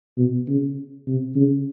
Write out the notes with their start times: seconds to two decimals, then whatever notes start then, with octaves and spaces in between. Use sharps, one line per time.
0.17 B2
0.48 C#3
1.07 C3
1.36 C#3